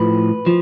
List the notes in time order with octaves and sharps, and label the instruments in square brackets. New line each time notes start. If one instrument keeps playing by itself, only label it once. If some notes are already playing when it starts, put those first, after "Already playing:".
Already playing: [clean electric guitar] A2 F3 B4
F3